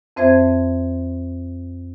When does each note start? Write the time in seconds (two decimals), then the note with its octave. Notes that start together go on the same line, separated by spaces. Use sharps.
0.16 F2 C4 C5 E5 G#6